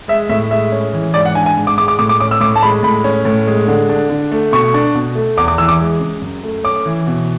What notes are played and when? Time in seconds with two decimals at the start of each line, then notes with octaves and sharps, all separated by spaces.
0.08 G#3 E5
0.29 A2 E5
0.51 G#3 E5
0.72 C#4
0.93 E3
1.14 G#2 D5
1.25 F#5
1.35 D4 G#5
1.46 G#5
1.57 G#2
1.67 D6
1.78 G#3 D6
1.88 D6
1.99 A2 D6
2.09 D6
2.20 C#4 D6
2.31 E6
2.41 A2 D6
2.56 A5
2.62 G#3 B5
2.83 A2 B5
3.04 C#4
3.25 A2
3.47 G#3
3.67 D3
3.90 D4
4.10 D3
4.32 A3
4.52 B2 C#6
4.74 D4
4.95 B2
5.15 A3
5.37 E2 D6
5.48 D6
5.58 E3 E6
5.68 D6
5.80 G#3
6.00 C#3
6.22 F#2
6.43 A3
6.64 C#4 D6
6.86 E3
7.07 B2